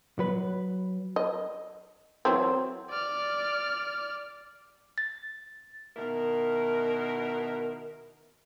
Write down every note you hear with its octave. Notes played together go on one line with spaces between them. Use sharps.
F#3 B4
D#5
E3 F#3 C4
D5 F6
A6
B2 D#3 E4 A#4